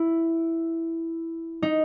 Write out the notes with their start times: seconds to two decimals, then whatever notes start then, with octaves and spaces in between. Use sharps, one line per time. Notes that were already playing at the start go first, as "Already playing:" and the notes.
Already playing: E4
1.62 D#4